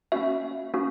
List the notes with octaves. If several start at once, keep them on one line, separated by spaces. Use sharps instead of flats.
A#3 C#4 F#4 E5
A#3 C#4 F#4